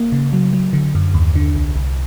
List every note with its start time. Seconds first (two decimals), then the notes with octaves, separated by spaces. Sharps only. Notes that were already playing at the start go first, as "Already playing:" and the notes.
Already playing: A#3
0.12 C#3
0.33 F#3
0.53 F#3
0.73 D3
0.95 F#2
1.14 D#2
1.35 D3
1.56 C2
1.76 C2